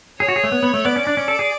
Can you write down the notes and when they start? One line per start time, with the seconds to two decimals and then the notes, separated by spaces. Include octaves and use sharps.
0.19 G#4 C#5
0.28 F#4
0.36 G#4
0.44 A3
0.52 B3
0.63 B3
0.74 A3
0.85 B3 D5
0.96 C#4
1.07 D4
1.17 C#4
1.28 A4
1.39 G#4